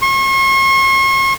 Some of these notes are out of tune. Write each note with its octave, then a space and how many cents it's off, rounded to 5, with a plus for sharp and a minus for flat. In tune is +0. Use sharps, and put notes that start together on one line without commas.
C#6 -45